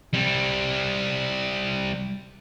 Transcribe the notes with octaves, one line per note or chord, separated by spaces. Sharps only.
G3 C4